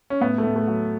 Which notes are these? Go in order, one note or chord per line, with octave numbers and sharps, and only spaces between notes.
C#4
A2 B3
A3
A2
A3
F#3